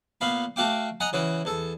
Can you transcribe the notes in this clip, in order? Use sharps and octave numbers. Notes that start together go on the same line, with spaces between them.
A#2 B3 F5 B5
A3 F#4 F5 G5 D6
D#5 F#5 G#5 A#5
C#3 E3 C#4 F#4
E2 A4